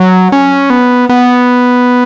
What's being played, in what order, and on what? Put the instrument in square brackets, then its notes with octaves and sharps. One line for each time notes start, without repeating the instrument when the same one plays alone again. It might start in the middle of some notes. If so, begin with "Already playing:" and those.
Already playing: [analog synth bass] F#3
C#4
B3
B3